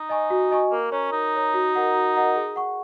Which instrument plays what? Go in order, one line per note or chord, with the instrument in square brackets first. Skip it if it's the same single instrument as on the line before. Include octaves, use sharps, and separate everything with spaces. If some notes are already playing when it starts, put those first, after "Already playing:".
Already playing: [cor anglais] D#4
[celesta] D#5 G#5 C#6
F#4
D#5 G#5 C#6
[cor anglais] A#3 [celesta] A#4
[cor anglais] C#4 [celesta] C#5 A#5
[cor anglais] D#4 [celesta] A#4
[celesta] C#5 A#5
F#4
A#4 D#5 F#5 A#5
F#4
A#4 D#5 F#5 A#5
G#4
F#5 C#6